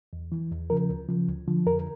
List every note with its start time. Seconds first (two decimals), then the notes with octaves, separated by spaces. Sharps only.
0.13 E2
0.32 E3
0.51 E2
0.70 C#3 F3 A#4
0.90 D2
1.08 C#3 F3
1.27 D2
1.47 D3 F3
1.66 F2 A#4